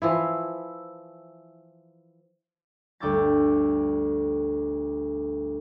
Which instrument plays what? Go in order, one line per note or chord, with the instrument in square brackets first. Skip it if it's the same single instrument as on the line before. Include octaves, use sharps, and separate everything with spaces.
[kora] E3 F3 E4
[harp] G1 D2 G5 D6 E6 A6